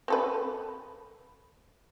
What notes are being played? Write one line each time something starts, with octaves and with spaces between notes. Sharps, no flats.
C4 A4 B4